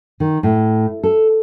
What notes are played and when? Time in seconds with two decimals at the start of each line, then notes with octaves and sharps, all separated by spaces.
0.20 D#3
0.43 A2
1.03 A4